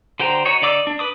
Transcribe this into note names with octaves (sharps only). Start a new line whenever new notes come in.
D3 F#4 C5 G5 A#5
D#4 F#4 C#5
D3 D#4 D5 D6 E6
D4
B4 D6 D#6